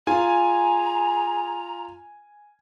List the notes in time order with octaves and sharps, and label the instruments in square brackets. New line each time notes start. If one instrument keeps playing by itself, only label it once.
[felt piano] F4 [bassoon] G#4 [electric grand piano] G#5 [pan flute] A#5